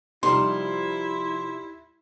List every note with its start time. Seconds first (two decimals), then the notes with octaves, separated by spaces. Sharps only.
0.23 C3 F3 G3 D#4 E4 C6